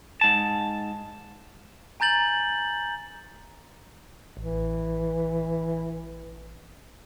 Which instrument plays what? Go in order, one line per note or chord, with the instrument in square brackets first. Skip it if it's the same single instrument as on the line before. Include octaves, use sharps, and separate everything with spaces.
[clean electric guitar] G#2 A5
[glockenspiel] G#5 A#5 G6 A6 F#7
[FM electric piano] A1 [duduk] E3